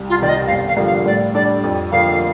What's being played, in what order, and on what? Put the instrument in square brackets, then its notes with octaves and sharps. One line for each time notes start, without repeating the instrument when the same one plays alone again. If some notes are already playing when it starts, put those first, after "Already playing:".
Already playing: [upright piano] C2
[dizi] F4
[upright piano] C3 D#3 [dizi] D5
[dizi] D#5
[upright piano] G1 [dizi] F5
[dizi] F5
[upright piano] G2 D3 F3 A#3
[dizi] F5
[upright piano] A2 [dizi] D5
[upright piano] G3 D4 A4 [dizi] D5
[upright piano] F2
[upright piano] D3 F3 A#3 [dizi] F5